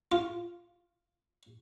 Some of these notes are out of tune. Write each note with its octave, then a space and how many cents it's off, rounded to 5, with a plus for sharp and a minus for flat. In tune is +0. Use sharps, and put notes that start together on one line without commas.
F4 +0